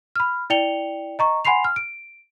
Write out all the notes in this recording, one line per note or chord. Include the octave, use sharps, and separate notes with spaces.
B5 F6
E4 D5 G5 C#7 F7 G7
D#5 A#5 C#6
F#5 G#5 B5 C6 C7 F7
F6
D7